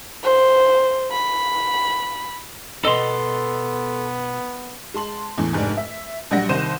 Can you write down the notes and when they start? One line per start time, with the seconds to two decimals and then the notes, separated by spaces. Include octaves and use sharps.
0.24 C5
1.12 B5
2.85 B2 B3 A4 D5 D#5 C6
4.94 G#3 A5 C6 F#7
5.38 E2 A2 E3
5.53 F1 G#2 D4 G#5
5.77 E5
6.31 A#1 F#3 G3 F#5 A#6
6.49 C2 D#3 C5 G6 D#7 E7